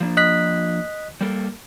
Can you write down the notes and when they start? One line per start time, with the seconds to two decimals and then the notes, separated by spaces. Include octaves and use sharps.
0.01 F3 A#3 D4
0.17 D#5 F#6 B6
1.21 G3 A#3 A4